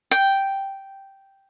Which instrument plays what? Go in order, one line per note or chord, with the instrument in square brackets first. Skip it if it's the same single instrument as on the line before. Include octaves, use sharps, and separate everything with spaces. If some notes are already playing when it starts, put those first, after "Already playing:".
[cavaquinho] G5